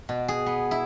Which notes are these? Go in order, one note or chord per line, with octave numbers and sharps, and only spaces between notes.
B2
G#4
B3
E4